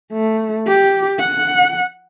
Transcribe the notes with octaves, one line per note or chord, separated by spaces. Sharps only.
A3
G4
F#5